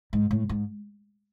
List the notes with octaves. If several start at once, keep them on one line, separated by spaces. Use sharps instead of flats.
G#2
A2
G#2